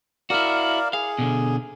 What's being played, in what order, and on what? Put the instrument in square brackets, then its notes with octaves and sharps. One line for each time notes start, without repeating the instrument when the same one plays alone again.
[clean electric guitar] E4 F#4 [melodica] A#4 D5 F5
[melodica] G#4 [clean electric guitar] F5
[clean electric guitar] B2 D3